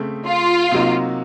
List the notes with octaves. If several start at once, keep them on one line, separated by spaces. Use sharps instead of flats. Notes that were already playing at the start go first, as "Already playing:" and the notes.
Already playing: C#3 A3 C4
F4
C3 F#3 A#3 D#4